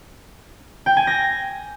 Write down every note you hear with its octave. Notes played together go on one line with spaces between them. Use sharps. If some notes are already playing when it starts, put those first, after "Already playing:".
G5
G#5
A#6